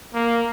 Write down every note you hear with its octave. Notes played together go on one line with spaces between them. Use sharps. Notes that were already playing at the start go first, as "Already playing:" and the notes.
A#3